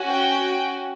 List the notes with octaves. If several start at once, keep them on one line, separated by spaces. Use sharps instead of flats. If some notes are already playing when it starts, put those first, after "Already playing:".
Already playing: C#4 F#4
G5